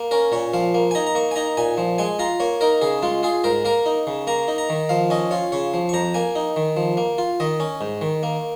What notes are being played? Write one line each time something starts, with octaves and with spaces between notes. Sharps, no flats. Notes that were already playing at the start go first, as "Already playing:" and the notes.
Already playing: A#3
C#4 A#4
A#2 C#5
F3 F5
A#3
G#5
D#4 A#5
A#5
A#3 C#6
G#5
D#4 A#5
A#2 G#5
F3
G#3 G#5
F4 A#5
A#3 C#5
D#4 A#4
C#3 G#4
G#3 F4
F4 G#4
G#2 A#4
A#3 A#4
D#4
C#3
A#3 A#5
D#4
A#5
D#3
F3 F5
C#4 D#5
F4 C#5
C#3 C#5
F3
C#6
F2 A#5
A#3 G#5
D#4
D#3
F3
A#3
F4
D#3 D#5
C#4
G#2
D#3
A#3